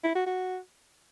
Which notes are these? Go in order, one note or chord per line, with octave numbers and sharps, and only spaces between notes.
E4
F#4
F#4